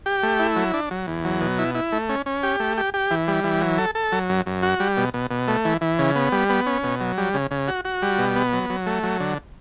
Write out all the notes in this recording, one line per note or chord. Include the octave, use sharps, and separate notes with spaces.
G4
A3
E4
F#3
D4
F#3
E2
F#3
B2
E4
E4
A3
C#4
C#4
G4
A3
G4
G4
E3
G3
E3
F#3
A4
A4
F#3
F#2
F#2
F#4
G3
B2
B2
B2
A3
E3
E3
C#3
B3
G3
B3
C#4
B2
F#3
G3
C#3
C#3
F#4
F#4
G3
B2
B3
F#3
F#3
A3
F#3
D3